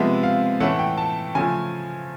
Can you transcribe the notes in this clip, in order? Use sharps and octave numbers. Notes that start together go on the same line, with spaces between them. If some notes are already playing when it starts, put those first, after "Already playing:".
Already playing: C3 F3 G#3 B3 E5
F5
A2 E3 A3 C#4 F#5
G5
A5
C#3 F3 A3 G#5